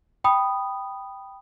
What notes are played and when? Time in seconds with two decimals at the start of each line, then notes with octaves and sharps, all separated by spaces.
0.24 G5 B5 D#6